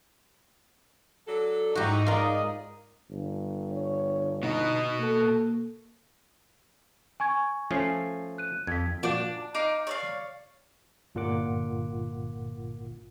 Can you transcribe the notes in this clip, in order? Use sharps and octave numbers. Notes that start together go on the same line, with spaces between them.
F#3 D4 A4
G#2 F#3 D#4 E4 F#4 G4
F4 G#4 A#4 D5 D#5
G1
C#5
B2 B3 D#4
A#3 A4
G#5 C#6 G#6
F3 A3 C#4 G#5 C7
F#6 D#7
F2 G#6 B6
A#2 F3 D4 F#4
D#4 F5 D6
C#5 D5 F5
G1 A#2 F4 A#4 F#5 D6